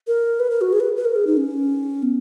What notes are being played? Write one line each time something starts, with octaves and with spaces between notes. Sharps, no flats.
A#4
B4
A#4
F#4
G#4
B4
B4
A#4
G#4
D#4
C#4
B3